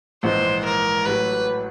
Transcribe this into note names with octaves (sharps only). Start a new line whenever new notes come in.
A#1 G#2 E3 G#3 C5
A#4
A1 A2 F#3 B4